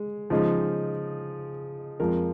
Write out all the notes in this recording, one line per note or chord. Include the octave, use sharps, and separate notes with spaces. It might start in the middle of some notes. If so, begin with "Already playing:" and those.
Already playing: G#3
C#3 F3 G#3 D#4 G#4
F2 F3 G#3 F4 A#4